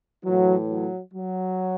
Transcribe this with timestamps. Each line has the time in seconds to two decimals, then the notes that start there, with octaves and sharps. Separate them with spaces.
0.25 A2 E3 F#3
0.69 F#3
1.13 F#3